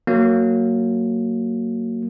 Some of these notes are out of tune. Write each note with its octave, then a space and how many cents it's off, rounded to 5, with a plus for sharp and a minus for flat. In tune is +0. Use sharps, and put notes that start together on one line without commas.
F#3 +0 A#3 -15